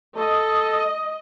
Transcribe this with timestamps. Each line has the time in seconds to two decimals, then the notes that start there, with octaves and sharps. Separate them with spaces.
0.17 A4 D#5